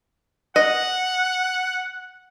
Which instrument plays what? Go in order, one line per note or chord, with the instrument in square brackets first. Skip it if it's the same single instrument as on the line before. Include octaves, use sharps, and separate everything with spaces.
[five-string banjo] D#5 [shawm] F#5